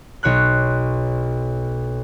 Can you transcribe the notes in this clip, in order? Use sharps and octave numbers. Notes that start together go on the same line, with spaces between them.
B1 C#5 C6 F#6